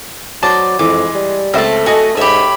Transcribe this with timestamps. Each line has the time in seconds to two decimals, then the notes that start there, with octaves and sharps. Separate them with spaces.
0.43 F#3 C5 D5 D#5 A5
0.79 F2 E3 G#3 D6
1.15 G3
1.54 C#2 A3 C4 C5 E5 A5
1.86 F#4 A4 D#5 G#5
2.17 G#2 G4 C#5 E5 B5